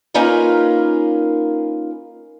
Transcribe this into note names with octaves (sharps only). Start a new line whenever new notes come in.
A#3 C#4 D#4 F4 A#4 B4